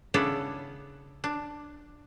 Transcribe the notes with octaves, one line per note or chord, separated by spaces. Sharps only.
C#3 B3 D4 E4 A4
D4